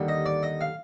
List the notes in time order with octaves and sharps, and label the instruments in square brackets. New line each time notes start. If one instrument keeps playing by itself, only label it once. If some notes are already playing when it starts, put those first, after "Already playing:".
Already playing: [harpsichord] D#2 D3 G3
D#5
D5
D#5
F5